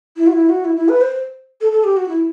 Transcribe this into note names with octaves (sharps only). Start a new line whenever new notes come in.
E4
F#4
E4
F#4
E4
E4
B4
C5
A4
A4
G4
F#4
E4